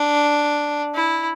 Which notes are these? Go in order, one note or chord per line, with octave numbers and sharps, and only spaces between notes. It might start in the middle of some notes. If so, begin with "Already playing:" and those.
Already playing: D4
E4